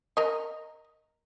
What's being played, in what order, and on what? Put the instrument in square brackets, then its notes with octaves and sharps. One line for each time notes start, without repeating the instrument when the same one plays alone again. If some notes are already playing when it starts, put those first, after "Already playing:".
[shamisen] A#4 D#5